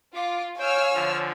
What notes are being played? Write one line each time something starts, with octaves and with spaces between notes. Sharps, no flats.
F4 F5 D6
C#5 G5 G#5 E6 F6
D3 F3